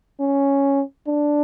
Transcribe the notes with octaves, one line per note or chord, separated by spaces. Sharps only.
C#4
D4